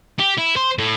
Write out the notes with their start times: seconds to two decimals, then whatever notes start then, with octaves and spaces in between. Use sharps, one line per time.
0.19 G4
0.38 E4
0.56 C5
0.78 A2